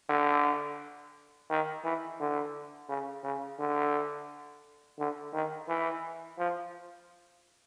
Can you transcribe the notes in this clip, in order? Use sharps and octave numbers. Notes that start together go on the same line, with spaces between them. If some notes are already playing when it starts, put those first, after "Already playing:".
D3
D#3
E3
D3
C#3
C#3
D3
D3
D#3
E3
F3